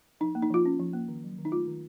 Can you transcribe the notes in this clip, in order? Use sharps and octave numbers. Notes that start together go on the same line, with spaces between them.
F3 D#4
A#3
D#4
F3 F4
C#4
F3
A#3
D#3
F#3
D#3
D#4
A3 F4
D#3